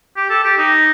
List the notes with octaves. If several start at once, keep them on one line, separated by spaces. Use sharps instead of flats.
G4
A4
G4
D#4